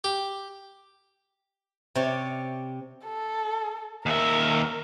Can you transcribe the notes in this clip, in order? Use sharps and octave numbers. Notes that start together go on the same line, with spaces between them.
G4
C3 C#5 D5
A4
D#2 A#4 E5